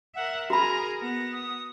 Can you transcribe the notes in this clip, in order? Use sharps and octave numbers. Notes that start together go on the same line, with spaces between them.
A#4 E5 F#5
F#4 G#4 A#4 A#5 B5
B3 A#6
D#6